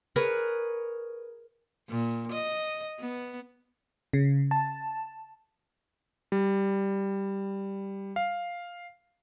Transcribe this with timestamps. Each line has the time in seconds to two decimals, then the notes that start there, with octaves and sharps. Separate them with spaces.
0.16 G#4 A#4 B4 C#5
1.89 A#2
2.32 D#5
2.99 B3
4.13 C#3
4.51 A5
6.32 G3
8.16 F5